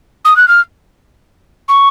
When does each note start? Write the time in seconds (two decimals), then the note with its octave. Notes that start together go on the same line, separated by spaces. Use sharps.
0.25 D#6
0.37 F#6
0.48 F6
1.69 C#6